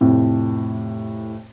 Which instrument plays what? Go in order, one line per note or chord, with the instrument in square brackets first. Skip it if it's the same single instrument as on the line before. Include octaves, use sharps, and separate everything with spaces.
[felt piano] F2 A2 C3